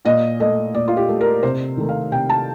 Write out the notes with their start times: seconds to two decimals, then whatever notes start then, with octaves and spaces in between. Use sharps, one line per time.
0.05 A#2 D#5
0.40 A3 D#5
0.74 A#2 D5
0.88 F4
0.97 G4
1.08 A3
1.21 A#4
1.43 C3 C5
1.77 D#3 A3
1.89 F5
2.12 C3 G5
2.29 A5